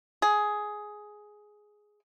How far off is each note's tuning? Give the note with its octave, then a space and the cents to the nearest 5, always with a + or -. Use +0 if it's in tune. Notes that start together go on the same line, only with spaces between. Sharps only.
G#4 +10